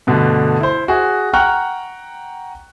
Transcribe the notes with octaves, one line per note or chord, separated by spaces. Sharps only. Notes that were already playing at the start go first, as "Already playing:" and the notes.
G2 B2 D3 A3
E4 C5
F#4 G#4 E5
F#5 G5 A#5 C#6 F6 F#6